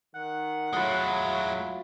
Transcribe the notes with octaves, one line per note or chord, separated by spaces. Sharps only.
D#3 F#5
A2 F#3 G#3 E4 F4